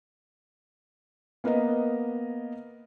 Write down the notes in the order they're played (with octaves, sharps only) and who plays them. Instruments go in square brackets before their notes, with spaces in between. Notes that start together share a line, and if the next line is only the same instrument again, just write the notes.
[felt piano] A#3 B3 A#4 B4 D#5